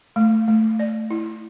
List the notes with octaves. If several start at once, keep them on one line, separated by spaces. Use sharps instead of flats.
A3
A3
D5
E4